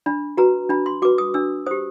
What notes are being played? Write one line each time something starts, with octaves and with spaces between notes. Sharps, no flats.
D4 B5
F#4 B4 A#5
D4 B5
C6
F#4 B4 D6
D#6
D4 E6
G4 C5 D#6